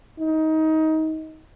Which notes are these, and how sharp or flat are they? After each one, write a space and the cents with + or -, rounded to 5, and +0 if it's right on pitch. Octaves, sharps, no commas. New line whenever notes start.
D#4 +20